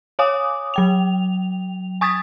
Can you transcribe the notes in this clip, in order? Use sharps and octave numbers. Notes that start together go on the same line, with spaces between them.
C#5 F5 G#5 D6 D#6
F#3 G5 F7
G#5 C#6 D#6 G#6 A6 B6